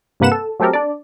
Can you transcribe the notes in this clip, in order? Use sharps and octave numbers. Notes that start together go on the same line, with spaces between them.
G2 C3 A#3 B4 F#5 E7
A4
F#3 A3 C4 G4 A4 A#4
D4 D5